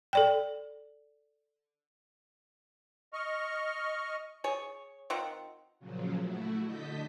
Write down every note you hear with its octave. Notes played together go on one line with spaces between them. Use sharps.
A4 D5 G5
D#5 C#6 F6
G#4 C#5
D#3 C4 F4 F#5
A#2 C#3 F3 F#3
A3 E4 F#4
D3 D#5 A5 G6 B6